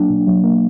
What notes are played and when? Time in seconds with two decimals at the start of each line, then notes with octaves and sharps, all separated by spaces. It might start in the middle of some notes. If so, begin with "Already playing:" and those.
Already playing: F#3 A#3 D4
0.10 B2
0.27 F#3
0.44 A#3